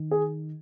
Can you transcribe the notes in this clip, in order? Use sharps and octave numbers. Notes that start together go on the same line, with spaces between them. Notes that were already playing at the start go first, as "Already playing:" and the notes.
Already playing: D#3
G#4